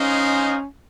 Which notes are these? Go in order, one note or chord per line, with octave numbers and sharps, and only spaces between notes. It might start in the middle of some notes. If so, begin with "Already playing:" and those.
Already playing: G#3 C#4 D#4 G#4 C5 F5